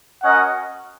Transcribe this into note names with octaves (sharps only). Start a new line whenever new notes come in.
C#4 F#4 A#4 D#5 F#5